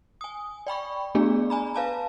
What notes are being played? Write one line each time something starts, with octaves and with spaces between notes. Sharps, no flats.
G#5 D#6
D5 G5 B5 C#6
A3 B3 D4 G#4 D5
G#5 A#5 B5
B4 F5 A5 A#5